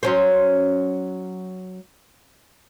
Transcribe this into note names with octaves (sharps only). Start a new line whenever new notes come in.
F#3 C#4 C5